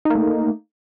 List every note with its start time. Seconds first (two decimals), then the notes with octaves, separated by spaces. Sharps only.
0.05 D#4
0.10 A#3
0.15 A3